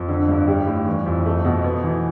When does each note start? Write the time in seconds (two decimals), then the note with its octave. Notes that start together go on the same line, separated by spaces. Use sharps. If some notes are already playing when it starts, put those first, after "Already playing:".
Already playing: F2
0.08 D3
0.28 G2
0.47 G3
0.67 A2
0.86 E3
1.06 F2
1.26 A3
1.45 B2
1.64 B3
1.84 E3